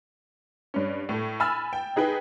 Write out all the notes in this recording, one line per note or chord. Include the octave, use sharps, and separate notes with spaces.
G2 C#4
A2 A3
G#5 B5 E6 F6 A6
G5
D#4 G#4 B4 G5